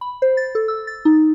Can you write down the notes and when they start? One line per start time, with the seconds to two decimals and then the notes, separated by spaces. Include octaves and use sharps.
0.01 B5
0.22 C5
0.37 A6
0.55 A4
0.68 E6
0.87 A6
1.05 D#4